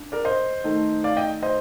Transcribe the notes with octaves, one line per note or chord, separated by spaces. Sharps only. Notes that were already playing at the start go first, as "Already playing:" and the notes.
Already playing: D4
A#4 D5
C5 D#5
D#3 A3 D#4
D5 F5
D#5 G5
C5 D#5